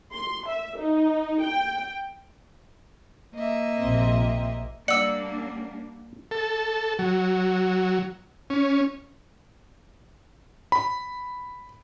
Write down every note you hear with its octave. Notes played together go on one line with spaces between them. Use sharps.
C6
E5
D#4
G5
A#3 D#5 E5
A#1 C3 C4
G3 A#3 D4 D5 F#5 E6 C#7
A4
F#3
C#4
B5